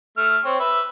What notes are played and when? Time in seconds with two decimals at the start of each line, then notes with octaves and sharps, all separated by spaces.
0.17 A3 F6
0.45 C4 C#5
0.60 B4 E5